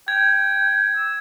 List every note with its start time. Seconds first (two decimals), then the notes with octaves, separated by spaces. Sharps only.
0.08 G5 G#6
0.96 E6